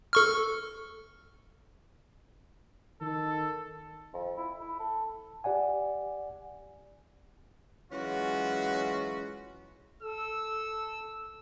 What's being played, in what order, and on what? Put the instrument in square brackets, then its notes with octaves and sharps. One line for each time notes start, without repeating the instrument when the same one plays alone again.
[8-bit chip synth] A4 C#6 F6
[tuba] D#3 [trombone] A4
[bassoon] F2
E4
E4
A4
[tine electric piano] G4 D5 F#5 G#5
[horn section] E3 F#3 G#3 C#4 F4 F#4
[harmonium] A4 [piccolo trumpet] E6